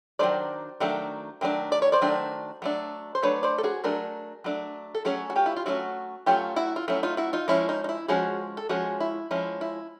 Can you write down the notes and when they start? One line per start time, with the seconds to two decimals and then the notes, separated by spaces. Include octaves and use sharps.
0.19 D#3 F#3 A3 D4 C5 D5
0.80 D#3 F#3 A3 D4
1.41 D#3 F#3 A3 D4
1.72 D5
1.82 C#5
1.92 C5 D5
2.01 D#3 F#3 A3 D4
2.62 F#3 A3 D4
3.15 C5
3.22 F#3 A3 D4 B4 C#5
3.43 C5 D5
3.58 A4
3.63 F#4 G#4
3.84 F#3 A3 D4 G#4 A#4
4.44 F#3 A3 D4
4.95 A4
5.05 F#3 A3 C#4 F#4 G#4
5.30 F#4
5.36 F4 G4
5.46 E4
5.56 F4
5.66 F#3 A3 C#4 E4 F#4
6.26 F#3 A3 C#4 F4 G4
6.56 E4 F#4
6.76 F4
6.88 F#3 A3 C#4 E4
7.03 D#4 F4
7.17 E4 F#4
7.33 D#4 F4
7.48 F3 G#3 C#4 E4
7.69 D#4
7.84 D#4
7.89 E4
8.08 F3 G#3 C#4 F#4 G#4
8.57 A4
8.69 F3 G#3 C#4 F#4 G#4
9.00 E4
9.31 F3 G#3 C#4 E4
9.61 E4